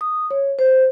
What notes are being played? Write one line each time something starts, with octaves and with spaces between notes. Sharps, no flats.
D#6
C#5
C5